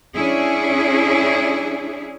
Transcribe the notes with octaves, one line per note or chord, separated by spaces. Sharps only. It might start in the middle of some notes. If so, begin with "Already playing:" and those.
C#4 D4 E4 G#4